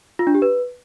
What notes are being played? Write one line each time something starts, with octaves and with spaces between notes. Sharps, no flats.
F4
D4
G4
B4